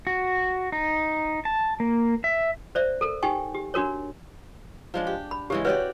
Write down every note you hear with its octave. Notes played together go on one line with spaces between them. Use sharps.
F#4
D#4
A5
A#3
E5
C5 D5 E5
A4 A#4
D#4 G4 G5 G#5 C#6
G4
D4 F#4 A#4 C#5
F3 G#3 D4
G4
B5
C#3 E3 G#3 G4
F#4 G4 B4 C#5 D5